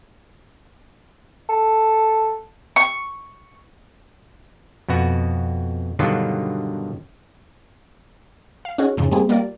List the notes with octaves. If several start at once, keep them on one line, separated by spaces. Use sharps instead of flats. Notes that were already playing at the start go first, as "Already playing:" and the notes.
A4
C#6
F2 B2 B3 F#4
G2 B2 D3 D#3 F#3 F4
F5
C#4 D#4 F#4 G#4
F2 G#2 C#3
G3 A3 A#3 C4 G#4
G3 A#3 F4 A#4 D5